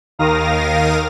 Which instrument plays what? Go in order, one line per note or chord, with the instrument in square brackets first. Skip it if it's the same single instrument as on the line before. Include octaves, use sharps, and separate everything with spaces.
[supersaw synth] D#2 D#3 A#4 F5 D#6 A#6